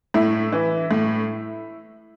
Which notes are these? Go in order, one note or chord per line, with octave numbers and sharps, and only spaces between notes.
A2 E4
E3
A2